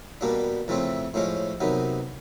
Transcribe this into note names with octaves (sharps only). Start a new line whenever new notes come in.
B2 G3 A#3 D4
F2 C#3 E3 A3 C4
A2 F3 G#3 C#4
C3 D#3 F#3 B3